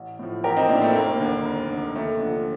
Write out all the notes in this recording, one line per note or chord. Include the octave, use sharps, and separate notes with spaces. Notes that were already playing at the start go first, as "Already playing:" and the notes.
Already playing: A1
A2 F3
A1 G4 A#4
C4 D#4
A2 F3 A#3 D4
A3 C4
F1 A#3
D#2 D3
F1
D#2 D3
D#2 A3
D3 F3